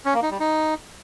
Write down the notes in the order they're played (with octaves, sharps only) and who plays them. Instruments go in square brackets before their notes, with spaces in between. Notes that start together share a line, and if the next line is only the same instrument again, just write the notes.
[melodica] C#4
A#3
D#4
G3
D#4